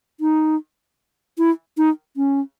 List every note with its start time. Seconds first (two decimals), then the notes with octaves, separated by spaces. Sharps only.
0.20 D#4
1.38 E4
1.77 D#4
2.17 C#4